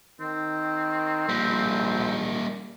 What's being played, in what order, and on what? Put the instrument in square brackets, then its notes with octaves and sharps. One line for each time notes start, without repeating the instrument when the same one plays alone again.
[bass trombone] D#3 [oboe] C4
[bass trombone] A#1 [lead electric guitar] G3 A#3